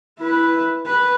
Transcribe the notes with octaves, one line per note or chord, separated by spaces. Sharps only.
E4 B4
B4